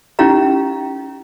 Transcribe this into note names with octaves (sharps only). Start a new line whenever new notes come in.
C#4 D#4 E4 G4 F5 A#5